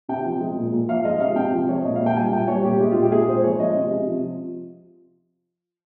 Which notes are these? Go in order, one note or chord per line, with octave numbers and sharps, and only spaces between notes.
C3 G5
F3
G#3
A#2
A#2
F3 F5
G#3 D#5
C3 F5
C3 G5
F3
G#3 C#5
A#2 D#5
F5
A#2
G5
G3 G#5
A#2 G5
G3 C#5
A#2 G4
G#3 G4
A#2 F4
G4
G#3 G#4
A#2 C5
F3 C#5
G#3 D#5
C3
C3
F3